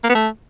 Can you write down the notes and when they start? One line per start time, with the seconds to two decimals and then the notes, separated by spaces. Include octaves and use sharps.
0.04 A#3
0.10 B3
0.15 A3